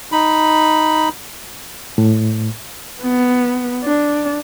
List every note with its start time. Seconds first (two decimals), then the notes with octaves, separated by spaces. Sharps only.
0.12 D#4 B5
1.98 A2
3.02 B3
3.84 D4